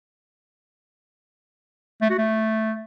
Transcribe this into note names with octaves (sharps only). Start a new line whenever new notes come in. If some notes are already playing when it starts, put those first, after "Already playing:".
A3
F#4
A3